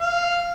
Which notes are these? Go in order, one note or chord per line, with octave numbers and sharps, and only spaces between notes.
F5